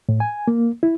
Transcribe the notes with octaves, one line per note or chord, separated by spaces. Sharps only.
A2
G#5
A#3
E4